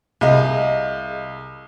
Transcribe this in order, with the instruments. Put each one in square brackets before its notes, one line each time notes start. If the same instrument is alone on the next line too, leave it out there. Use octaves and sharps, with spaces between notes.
[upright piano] C2 [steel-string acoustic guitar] G#4 D#5 F5